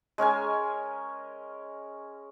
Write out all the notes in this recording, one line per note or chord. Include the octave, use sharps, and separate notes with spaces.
G#3 C#4 A#4 G#5